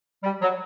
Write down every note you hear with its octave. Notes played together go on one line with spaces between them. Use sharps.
G3
F#3